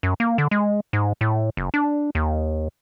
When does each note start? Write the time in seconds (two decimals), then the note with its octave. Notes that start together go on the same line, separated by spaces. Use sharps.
0.03 F#2
0.20 A#3
0.38 D3
0.51 G#3
0.93 G#2
1.21 A2
1.57 F#1
1.74 D4
2.15 D#2